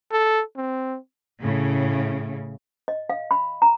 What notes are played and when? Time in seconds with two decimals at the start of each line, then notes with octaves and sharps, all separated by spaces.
0.12 A4
0.57 C4
1.40 A2 C#3
2.88 D#5
3.10 F5
3.31 B5
3.62 A#5